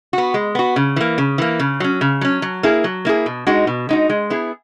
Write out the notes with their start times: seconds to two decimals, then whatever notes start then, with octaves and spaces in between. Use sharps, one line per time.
0.13 B3 F#4
0.34 G#3
0.55 B3 F#4
0.76 C#3
0.96 E3 A#3
1.18 C#3
1.38 E3 A#3
1.59 C#3
1.80 F#3 C#4
2.01 C#3
2.21 F#3 C#4
2.42 F#3
2.63 A#3 E4 G#4
2.84 F#3
3.05 A#3 E4 G#4
3.26 B2
3.47 G#3 D#4 F#4
3.67 B2
3.89 G#3 D#4 F#4
4.10 G#3
4.30 B3 E4 G#4